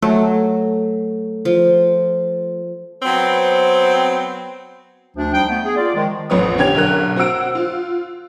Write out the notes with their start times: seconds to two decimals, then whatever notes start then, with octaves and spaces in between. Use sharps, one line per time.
0.02 F#3 A3
1.45 F3
3.02 F#3 B3 C4
5.16 D2 F3 D4
5.33 G3 D#4 C5 G5
5.49 A3 B3
5.64 G#4
5.76 F4 D5
5.95 D#3 F3 G#3
6.30 A1 F2 B3 C#5 D#6
6.58 D3 C#4 G4 G#6 F7
6.75 B1 D3 A#4 F#6
7.16 C4 F#4 F#5 E6 D7
7.55 F4